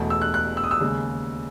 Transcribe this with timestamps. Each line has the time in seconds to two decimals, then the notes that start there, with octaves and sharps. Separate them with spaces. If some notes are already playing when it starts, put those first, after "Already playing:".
Already playing: E1 E2 B2 A3
0.10 E6
0.22 F#6
0.34 F#6
0.57 E6
0.64 D#6
0.71 E6
0.80 D#2 C#3 G#3